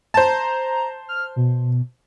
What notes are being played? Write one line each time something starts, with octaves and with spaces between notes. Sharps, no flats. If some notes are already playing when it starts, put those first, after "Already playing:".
C5 A5 A#5
F6
B2